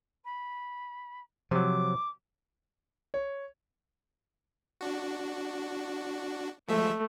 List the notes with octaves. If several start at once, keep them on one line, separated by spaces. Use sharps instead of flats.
B5
C3 F3 F#3 D6
C#5
D4 F#4
F3 G#3 A3 E5